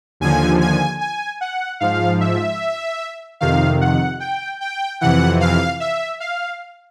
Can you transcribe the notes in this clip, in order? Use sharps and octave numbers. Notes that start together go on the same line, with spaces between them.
D#2 D3 F3 G#5
G#5
G#5
F#5
G#2 F3 F5
E5
F2 C3 D#3 F5
F#5
G5
G5
F2 C3 E3 F#5
F5
E5
F5